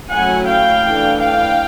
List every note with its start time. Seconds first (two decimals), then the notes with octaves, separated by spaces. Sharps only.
0.11 F#3 A3 C#4 E4 F#5 G#5
0.47 F5 G5
0.83 E3 A3 D4
1.20 F5 G5